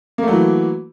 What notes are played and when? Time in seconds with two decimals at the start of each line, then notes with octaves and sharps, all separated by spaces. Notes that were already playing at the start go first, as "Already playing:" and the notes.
0.18 A#3
0.23 A3
0.28 F#3
0.33 E3